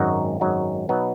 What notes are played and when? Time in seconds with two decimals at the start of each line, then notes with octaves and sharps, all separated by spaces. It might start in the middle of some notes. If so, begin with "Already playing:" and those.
Already playing: G#1 F#2 F#3 D#4 F#4
0.40 G#1 F#2 F#3 D#4 F#4
0.89 B2 F#3 B3 D#4